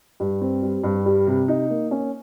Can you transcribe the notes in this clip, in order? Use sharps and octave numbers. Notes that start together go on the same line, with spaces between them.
G2
C4
G3
G2
G3
C3
D#4
A#3
C#4